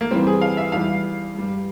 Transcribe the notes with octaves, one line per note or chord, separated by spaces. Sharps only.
A#3
E2 E3 G3 C4
G#4
F5
E5
E2 E3 G3 F5
G2 G3